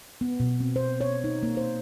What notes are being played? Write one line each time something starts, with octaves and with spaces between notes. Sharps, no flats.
B3
B2
C4
C5
C#5
D#4
A#3
C5